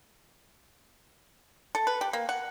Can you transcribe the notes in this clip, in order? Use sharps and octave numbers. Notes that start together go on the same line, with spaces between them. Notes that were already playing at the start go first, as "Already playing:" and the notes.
A4
B4
G4
A#3
F#5